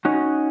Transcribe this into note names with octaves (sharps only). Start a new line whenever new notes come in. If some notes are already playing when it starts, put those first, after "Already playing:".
C#4 D#4 F#4